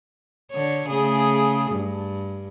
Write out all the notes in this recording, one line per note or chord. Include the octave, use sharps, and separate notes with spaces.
D3 C#5
C#3 A3 G#4
G2